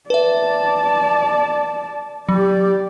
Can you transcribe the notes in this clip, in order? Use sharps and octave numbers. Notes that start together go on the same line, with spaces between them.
B4 D5 E5 A5
F#3 G4 D5